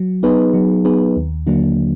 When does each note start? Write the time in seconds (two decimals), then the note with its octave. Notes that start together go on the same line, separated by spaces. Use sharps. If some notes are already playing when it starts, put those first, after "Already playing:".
Already playing: F#3
0.23 B3 D#4 G#4 B4
0.54 F#3
0.85 B3 D#4 G#4 B4
1.17 D#2
1.47 D3 F#3 A#3 D4